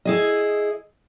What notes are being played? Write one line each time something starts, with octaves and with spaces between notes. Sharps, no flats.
E4 G#4 D#5